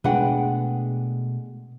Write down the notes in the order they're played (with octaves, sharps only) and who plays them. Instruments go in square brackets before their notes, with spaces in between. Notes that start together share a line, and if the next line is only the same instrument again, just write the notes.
[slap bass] B2 A3 [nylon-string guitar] G#3 D4 [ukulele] B4 F#5 G5